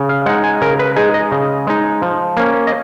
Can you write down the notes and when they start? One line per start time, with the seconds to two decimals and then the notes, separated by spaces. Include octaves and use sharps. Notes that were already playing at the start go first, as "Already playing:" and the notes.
Already playing: C#3
0.09 F5
0.26 G#3 D#4 F#5
0.44 G#5
0.61 C#3 A#4
0.79 B4
0.96 G#3 D#4 G#4
1.14 D#5
1.32 C#3
1.67 G#3 D#4
2.02 F3
2.37 A#3 C#4
2.67 D#5